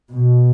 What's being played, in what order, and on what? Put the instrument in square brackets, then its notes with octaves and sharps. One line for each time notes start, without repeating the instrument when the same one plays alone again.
[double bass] B2